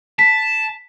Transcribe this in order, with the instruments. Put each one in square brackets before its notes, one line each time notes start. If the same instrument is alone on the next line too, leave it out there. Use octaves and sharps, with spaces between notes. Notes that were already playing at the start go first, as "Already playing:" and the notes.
[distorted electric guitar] A5 [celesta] B6